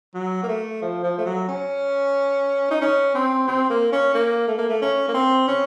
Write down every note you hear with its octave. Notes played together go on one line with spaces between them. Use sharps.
F#3
A#3
A3
F3
F3
A3
F#3
C#4
D#4
C#4
C4
C4
A#3
C#4
A#3
A3
A#3
A3
C#4
A#3
C4
C#4